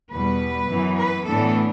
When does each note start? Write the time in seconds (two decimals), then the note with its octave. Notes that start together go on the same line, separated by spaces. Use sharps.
0.12 E2 B2 G3 B3 B4
0.70 F#2 E3 B3
0.98 B4
1.27 A2 E3 B3 D4 A4